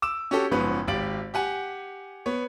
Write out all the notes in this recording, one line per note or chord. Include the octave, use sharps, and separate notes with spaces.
D6 E6 E7
C#4 F#4 G4 A4
F#1 G#2 F3 B3 C#4 B4
G#1 G4 F5 A6 D7 F#7
G4 F#5 G#5
B3 C#5